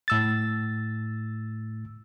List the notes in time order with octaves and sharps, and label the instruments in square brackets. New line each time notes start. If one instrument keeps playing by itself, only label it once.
[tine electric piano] A2 E6 A6